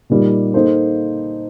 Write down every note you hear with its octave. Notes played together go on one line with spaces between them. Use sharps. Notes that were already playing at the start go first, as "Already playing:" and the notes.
A#2 G3 A#3 D#4
A#3 D#4 A4 C5